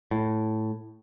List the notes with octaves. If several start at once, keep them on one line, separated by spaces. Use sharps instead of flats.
A2